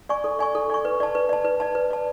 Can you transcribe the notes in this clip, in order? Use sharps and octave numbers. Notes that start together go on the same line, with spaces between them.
D5 G#5 C#6
A4
D5 G#5 C#6
A4
D5 G#5 C#6
B4
D5 A5
B4
D5 A5
B4
D5 A5
B4
D5 A5